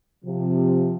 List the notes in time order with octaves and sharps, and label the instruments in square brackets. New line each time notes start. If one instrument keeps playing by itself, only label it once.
[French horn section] C3 F3